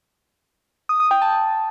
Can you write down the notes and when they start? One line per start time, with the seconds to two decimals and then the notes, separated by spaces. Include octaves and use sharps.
0.89 D#6
1.00 D#6
1.11 G5
1.22 A5